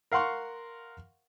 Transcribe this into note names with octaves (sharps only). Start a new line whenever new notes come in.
A#4 F5 F#5 C6 C#6